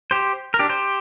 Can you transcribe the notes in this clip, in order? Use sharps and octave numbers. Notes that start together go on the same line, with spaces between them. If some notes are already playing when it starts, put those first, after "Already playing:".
G4 C5
A#4
D4 G4
G4 C5